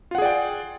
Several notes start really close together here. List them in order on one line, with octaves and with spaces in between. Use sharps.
F4 F#5 G#4 D5 G5